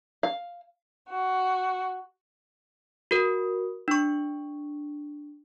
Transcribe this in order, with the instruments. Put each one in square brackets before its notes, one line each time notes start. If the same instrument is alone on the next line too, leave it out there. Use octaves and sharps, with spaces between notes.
[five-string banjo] F5
[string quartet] F#4
[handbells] F#4 A#4
D4 C#6